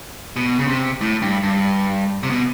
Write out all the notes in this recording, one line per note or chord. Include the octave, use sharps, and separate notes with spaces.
B2
C#3
C3
A2
G2
G2
C3
B2